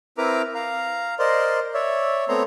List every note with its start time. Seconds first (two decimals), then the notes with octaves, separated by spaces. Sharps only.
0.18 C4 E4 A#4 B4 A#5 D6
0.55 F5 A#5
1.19 A#4 C5 D5 D#5 C6
1.74 C#5 D5 E5
2.29 A3 B3 C4 C#5 A#5 C6